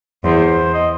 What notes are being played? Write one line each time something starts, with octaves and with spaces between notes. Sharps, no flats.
E2 C5
D#5